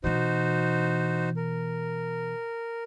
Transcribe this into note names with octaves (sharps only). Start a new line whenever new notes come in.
B2 E3 D#4 F#4 C5
A#4